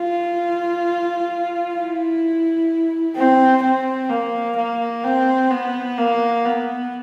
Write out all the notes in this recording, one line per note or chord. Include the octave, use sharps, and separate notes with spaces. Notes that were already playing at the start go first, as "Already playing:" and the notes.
Already playing: F4
E4
C4
C4
A#3
A#3
C4
B3
A#3
B3